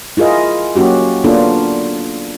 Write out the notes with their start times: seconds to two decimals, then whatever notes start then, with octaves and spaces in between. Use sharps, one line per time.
0.17 E4 F4 G#4 A#4 D#5
0.76 F#3 A#3 C#4 F#4 G4
1.24 A#3 B3 D4 F4 A4